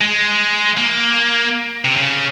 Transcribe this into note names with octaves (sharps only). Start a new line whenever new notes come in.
G#3
A#3
C3
C#3